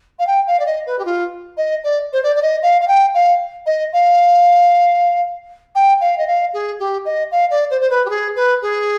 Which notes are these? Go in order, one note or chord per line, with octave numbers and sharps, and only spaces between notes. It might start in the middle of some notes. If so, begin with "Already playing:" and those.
F5
G5
F5
D5
D#5
B4
G4
F4
D#5
D5
C5
D5
D5
D#5
F5
F5
G5
F5
D#5
F5
G5
F5
D#5
F5
G#4
G4
D#5
F5
D5
C5
C5
B4
G4
G#4
B4
G#4